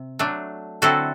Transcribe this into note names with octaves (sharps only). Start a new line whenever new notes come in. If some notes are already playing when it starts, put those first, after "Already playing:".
Already playing: C3
F#3 A3 D4
D3 F#3 C4 E4 F#4 A4